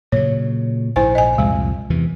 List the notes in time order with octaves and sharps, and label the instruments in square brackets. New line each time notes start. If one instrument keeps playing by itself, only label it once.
[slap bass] A#2 C#3 F#3 [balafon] C#5
[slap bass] A#1 G#2 [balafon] E4 C5 G#5
[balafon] D#5 G#5
[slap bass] C2 F2 A#2 [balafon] G#3
[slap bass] E2 C3 E3